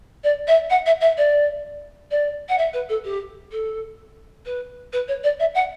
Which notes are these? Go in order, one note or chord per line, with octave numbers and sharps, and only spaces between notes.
D5
E5
F#5
E5
E5
D5
D5
F#5
E5
B4
A4
G4
A4
B4
B4
C#5
D5
E5
F#5